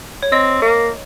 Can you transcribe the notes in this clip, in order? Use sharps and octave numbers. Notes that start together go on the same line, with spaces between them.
C#5
C4 D#5
A#3